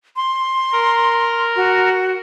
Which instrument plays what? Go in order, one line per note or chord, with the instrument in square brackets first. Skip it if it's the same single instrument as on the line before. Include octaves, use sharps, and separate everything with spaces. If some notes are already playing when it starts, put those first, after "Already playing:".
[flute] C6
[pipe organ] A#4
[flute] F#4